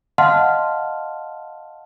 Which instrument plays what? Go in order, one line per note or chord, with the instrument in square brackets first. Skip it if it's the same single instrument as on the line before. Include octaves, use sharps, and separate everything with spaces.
[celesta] D#5 F5 F#5 A5 C6 F6